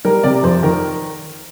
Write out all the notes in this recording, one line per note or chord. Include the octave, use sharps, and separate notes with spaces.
G3 A#4
C3 D5
F2 C5
D#3 A#4